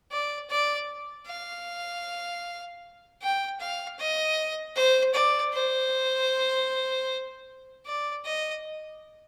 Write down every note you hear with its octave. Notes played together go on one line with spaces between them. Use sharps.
D5
D5
F5
G5
F5
D#5
C5
D5
C5
D5
D#5